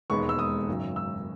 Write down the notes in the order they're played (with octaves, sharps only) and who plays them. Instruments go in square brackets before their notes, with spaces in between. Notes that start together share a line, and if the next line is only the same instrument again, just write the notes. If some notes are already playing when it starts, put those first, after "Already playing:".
[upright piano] E1 D#2 D#3 G#3 B3 C#6
E6
D#6
G#1 F#2 C#3 F#3
E6